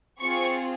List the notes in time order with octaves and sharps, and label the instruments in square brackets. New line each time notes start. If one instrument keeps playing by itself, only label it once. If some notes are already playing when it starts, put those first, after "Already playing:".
[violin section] C4 F4 G#4 C#6